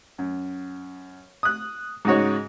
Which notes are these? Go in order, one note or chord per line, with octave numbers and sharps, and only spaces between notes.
F#2
D#6 F#6
G#2 C#3 D#4 F#4 C#5